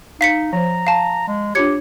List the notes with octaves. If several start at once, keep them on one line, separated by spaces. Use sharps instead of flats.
D#4 F5 B6 C#7
F3 C5 A#5
F5 A5
G#3
D4 F4 G4 C#5 G#6 C#7